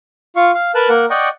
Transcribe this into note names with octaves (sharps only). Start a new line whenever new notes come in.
F4 F5 C#6
F5
A#4 B4 A5 F#6
A#3 A#4 F#5
D5 D#5 F#5 G5 C#6